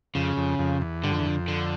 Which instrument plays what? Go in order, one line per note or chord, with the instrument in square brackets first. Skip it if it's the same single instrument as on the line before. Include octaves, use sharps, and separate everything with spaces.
[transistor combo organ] F2 [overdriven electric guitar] C#3
[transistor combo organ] F2
F2
E2
[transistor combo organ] G2 [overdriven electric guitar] D3
[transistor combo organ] F2
E2
F2
[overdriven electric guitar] D3